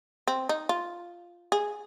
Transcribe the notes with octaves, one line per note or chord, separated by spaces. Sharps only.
C4
D#4
F4
G#4